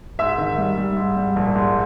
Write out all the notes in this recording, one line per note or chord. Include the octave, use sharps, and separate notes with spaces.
G#2 E5 E6
D#3
G3
G3
G#2
G3
A#1
G#2